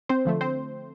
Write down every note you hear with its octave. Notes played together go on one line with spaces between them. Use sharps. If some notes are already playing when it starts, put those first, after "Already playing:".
C4 C5
D3 F3 A3
C4 C5